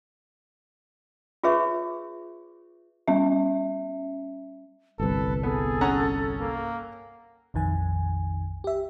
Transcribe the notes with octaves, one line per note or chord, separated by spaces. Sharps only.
F4 G#4 B4 C#5 E5 C#6
G3 C#4 E5
G1 C2 A4 B4
B3 G#4 A4
C#4 F#5 A#5
A#3
A#1 F2 D#3 G#5
G4 E5